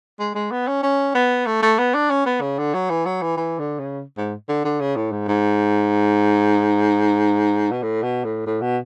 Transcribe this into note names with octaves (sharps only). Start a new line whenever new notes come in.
G#3
G#3
B3
C#4
C#4
B3
A3
A3
B3
D4
C#4
B3
C#3
D3
F#3
E3
F#3
E3
E3
D3
C#3
G#2
D3
D3
C#3
A2
G#2
G#2
B2
A2
B2
A2
A2
B2